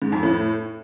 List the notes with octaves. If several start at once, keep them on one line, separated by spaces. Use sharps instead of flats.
G#2
F2
A2